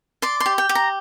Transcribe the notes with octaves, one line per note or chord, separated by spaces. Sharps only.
D5 C6
C6
G4
G5
G4
A#5